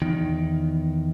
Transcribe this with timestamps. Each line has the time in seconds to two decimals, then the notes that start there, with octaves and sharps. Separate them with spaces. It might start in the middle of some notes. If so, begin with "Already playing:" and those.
0.02 E2 D#3